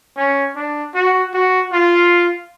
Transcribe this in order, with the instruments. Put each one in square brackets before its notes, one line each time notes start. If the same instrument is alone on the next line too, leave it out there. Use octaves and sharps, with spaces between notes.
[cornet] C#4
D4
F#4
F#4
F4